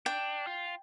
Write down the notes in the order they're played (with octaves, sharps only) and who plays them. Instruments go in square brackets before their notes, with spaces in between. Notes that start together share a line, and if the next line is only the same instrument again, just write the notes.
[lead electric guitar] D4 [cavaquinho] G5
[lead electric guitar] F4